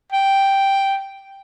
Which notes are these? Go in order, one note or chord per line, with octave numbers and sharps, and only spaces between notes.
G5